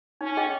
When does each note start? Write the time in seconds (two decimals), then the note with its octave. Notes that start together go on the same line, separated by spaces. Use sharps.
0.21 C#4 D#4
0.37 G#4 D#5 G5